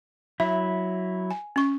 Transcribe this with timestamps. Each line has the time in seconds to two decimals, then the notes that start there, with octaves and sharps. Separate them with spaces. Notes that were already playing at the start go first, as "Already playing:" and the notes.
0.40 F#3 E4 E5
1.31 G#5
1.56 C#4 C#6